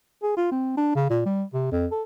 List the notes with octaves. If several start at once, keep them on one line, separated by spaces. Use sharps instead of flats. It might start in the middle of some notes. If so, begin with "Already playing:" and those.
G#4
F4
C4
D4
C#3
A#2
G3
C3
F2
A4